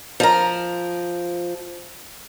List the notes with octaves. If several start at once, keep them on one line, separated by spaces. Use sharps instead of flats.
F3 A#4